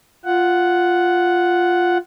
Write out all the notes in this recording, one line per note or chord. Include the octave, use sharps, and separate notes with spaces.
F4 F#5